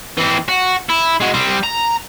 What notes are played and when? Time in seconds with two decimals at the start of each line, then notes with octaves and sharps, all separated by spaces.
0.17 E3 C4
0.49 F#4
0.90 E4
1.21 G#3 F#4
1.34 G3 C4
1.63 A#5